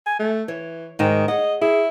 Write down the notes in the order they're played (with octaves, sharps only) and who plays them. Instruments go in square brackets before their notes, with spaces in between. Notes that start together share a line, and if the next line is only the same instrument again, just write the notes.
[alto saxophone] G#5
A3
[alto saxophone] E3 [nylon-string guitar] C#5
[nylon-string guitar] G#2 D#4 G5 [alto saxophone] D#3
[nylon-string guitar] G#4 C#5 F#5 [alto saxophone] D#5
[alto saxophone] E4 [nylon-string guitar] G#4